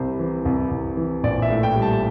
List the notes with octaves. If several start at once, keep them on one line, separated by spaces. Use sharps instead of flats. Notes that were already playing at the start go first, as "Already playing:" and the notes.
Already playing: C2 C3 C5
E3
C2
C2
E3
A#1 D5
E5
A2
G5
G3
A5
A5